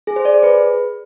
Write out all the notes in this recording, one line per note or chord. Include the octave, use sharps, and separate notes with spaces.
G#4
C5
D5
G#4
B4